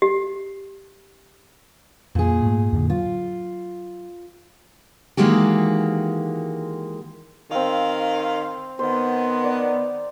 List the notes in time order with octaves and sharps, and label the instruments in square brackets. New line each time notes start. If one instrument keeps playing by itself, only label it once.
[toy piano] G4
[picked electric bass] F2 [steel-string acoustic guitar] A#2 G#4
[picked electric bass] G#2 A3
F2 A2 D3
[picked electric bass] F#3 [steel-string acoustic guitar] F4
[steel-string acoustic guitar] D#3 E3 G#3 A#3 F#4 G4
[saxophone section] D#3 F5 [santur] C4 E6
[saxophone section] D#3 B3 [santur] C5 F#5
[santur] D5
A#5